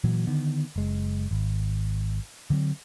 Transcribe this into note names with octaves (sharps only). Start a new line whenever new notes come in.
A#2 E3 F#3
D3 D#3 B3
F#1 G#3
G#1
D3 F#3 C4